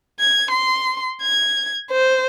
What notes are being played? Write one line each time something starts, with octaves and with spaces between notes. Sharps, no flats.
G#6
C6
G#6
C5